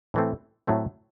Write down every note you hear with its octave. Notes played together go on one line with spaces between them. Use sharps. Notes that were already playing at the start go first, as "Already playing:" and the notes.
A2 E3 A3 C4
A2 F#3 A3 C4